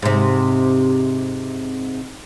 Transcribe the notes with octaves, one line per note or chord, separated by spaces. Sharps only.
G#2 C3